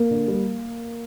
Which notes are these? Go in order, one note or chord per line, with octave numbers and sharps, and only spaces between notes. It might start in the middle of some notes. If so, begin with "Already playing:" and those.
Already playing: A#3
D3
G3